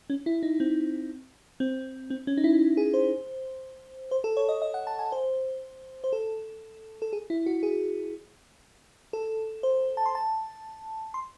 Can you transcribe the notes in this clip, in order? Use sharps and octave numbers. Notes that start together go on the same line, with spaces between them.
C#4
E4
D#4
C4
C4
C4
C#4
D#4
E4
G#4
C5
C5
A4
C#5
D#5
D#5
F#5
A5
G#5
C5
C5
A4
A4
G#4
E4
F#4
G#4
A4
C5
A5
C6
A5
C6